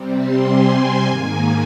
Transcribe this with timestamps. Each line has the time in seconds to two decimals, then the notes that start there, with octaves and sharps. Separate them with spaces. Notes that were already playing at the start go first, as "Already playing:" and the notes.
Already playing: C3 G3 C4
0.17 C6
0.46 G#5
1.05 G#2 D#3 A#3 G#5